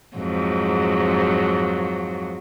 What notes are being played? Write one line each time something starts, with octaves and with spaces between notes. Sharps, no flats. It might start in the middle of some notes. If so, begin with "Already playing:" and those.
F2 G#2 F#3